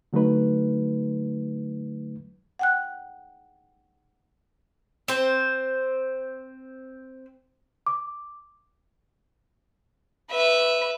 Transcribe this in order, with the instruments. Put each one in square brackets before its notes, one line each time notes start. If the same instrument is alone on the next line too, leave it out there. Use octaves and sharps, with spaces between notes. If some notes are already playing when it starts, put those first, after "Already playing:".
[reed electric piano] D3 F#3 A3 D#4 B4
[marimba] F#5 G5 F#6
[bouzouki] C4 C5
[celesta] D6
[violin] B4 E5